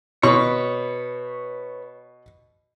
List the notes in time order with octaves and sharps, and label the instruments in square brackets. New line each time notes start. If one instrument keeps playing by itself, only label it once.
[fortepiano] B2 C#6 [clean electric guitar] B4 C#5